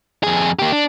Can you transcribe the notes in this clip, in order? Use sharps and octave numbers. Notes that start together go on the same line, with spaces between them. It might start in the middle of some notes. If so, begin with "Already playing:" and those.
F2 G#4
A#3 G4
D4